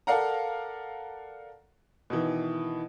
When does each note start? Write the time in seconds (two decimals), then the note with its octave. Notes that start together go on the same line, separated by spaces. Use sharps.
0.07 A4 A#4 D5 F5 F#5 A#5
2.10 B2 D#3 E3